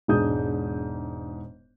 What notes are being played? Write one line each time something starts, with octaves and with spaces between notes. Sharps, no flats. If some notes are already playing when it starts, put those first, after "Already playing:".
E1 G#2 D4 D#6 G6